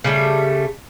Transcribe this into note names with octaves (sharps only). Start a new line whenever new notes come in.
C#3 G3 A3